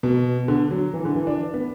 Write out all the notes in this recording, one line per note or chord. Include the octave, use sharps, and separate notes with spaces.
B2
D3
F#3
E3
D3
E3
D4
B3